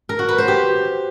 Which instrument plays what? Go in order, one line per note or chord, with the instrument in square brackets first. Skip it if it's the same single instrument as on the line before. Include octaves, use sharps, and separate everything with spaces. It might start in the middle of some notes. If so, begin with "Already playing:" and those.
[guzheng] A#4
F#4
B4
C5
G4